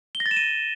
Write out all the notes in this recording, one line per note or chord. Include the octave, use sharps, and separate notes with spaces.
G7
A#6
A6
E7
D#7